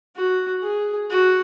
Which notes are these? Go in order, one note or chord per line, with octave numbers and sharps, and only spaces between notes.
F#4
G#4
F#4